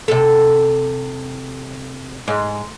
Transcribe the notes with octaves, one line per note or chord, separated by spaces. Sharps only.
C3 A4
G#2